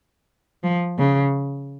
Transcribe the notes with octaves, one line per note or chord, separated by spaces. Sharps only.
F3
C#3